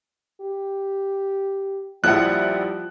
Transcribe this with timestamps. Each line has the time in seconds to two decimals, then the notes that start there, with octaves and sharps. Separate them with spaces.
0.41 G4
2.04 A#1 F3 G3 E4 F#5 F#6